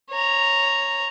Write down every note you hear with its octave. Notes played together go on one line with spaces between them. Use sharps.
C#5 A#5